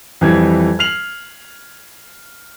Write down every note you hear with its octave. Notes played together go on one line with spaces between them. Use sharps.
F2 E3 G3 G#6
F6 C7 F7 F#7